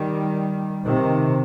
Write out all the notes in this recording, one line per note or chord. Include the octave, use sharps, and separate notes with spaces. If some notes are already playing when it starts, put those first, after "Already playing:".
Already playing: D#3 G3
C3 D#3